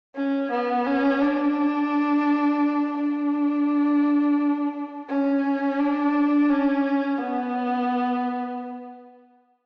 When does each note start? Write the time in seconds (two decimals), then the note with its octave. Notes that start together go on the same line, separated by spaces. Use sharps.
0.16 C#4
0.52 B3
0.86 C#4
1.22 D4
2.98 D4
5.09 C#4
5.79 D4
6.50 C#4
7.19 B3